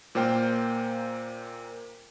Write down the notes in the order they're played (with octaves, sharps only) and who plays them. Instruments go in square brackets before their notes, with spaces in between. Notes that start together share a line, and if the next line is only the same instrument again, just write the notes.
[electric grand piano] A#2 A#3 C5 G5 F6